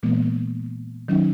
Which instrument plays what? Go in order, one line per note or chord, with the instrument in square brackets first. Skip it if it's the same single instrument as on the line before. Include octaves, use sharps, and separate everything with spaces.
[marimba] A#2 E3 G#3 A#3 B3
D#3 F#3 C#4 D#4